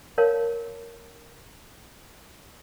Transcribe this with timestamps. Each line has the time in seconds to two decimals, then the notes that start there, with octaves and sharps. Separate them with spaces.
0.18 A#4 C#5 F5 A5